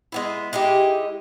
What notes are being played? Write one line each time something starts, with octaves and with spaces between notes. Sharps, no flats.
G#3 B3 E4
G#3 D#4 E4 G4